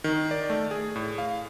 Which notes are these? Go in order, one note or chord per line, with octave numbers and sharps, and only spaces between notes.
D#3
D5
A3
G#4
A2
F5